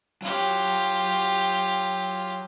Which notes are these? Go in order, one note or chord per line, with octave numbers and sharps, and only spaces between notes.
F#3 F4 G4 C#5